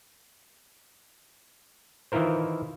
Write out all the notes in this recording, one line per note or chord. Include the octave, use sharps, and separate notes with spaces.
D#3 E3 E4 F4 A#4 C5